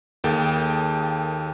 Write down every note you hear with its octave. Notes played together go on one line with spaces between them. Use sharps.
D#2 A#3 G#4 A4 G5 A5